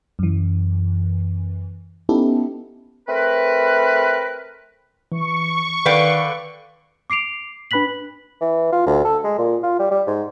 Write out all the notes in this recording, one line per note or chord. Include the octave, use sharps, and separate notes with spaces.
F#2 E3
B3 C#4 D#4 E4 G4 A4
A3 C4 A#4 B4
E3 C#6
D3 D#3 A4 B4 D5 F5 G5
D6 C7 D7 F7
D4 B4 B5 F#6 B6 F#7
E3
F4
D2
A4
G#3
A#2
F4
G3
G3
G#2